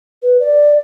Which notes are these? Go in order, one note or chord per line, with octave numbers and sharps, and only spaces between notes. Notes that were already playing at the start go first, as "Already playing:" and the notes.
B4
D5